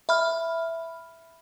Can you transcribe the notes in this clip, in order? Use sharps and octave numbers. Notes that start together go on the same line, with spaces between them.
E5 B5 F6